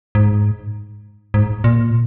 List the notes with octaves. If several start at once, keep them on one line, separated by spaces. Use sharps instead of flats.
G#2
G#2
A#2